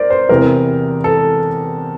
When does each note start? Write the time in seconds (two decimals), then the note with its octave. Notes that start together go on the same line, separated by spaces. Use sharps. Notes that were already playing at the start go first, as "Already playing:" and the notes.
Already playing: A#4 C5 D5
0.10 C5
0.29 E2 C3 E3 A#4
1.04 A4